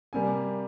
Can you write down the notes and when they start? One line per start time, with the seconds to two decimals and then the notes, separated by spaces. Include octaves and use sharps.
0.13 C3 G3 A#3 G#5